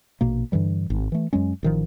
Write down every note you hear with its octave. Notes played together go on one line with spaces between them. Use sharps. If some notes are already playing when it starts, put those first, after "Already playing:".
A#1 B2 A#3
G2 D3 E3 G3
G#1
E3 A3
F#2 F#3 G#3 C#4
A1 D#3 F3